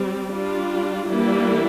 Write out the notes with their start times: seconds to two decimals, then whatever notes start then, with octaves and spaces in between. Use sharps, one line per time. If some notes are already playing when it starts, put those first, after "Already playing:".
Already playing: G3 C4
0.32 G3 D4 F4
1.11 E3 G3 A#3 D4 E4